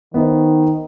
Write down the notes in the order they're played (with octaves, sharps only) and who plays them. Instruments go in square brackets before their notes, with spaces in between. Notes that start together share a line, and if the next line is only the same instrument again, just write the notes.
[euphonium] D#3 [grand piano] B3 D#4 C5